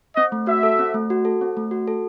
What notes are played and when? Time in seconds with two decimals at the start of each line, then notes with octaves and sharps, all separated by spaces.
0.16 C4 D#5
0.32 A3
0.47 F#4 E5
0.63 A4
0.79 C4
0.94 A3
1.10 F#4
1.25 A4
1.41 C4
1.57 A3
1.71 F#4
1.88 A4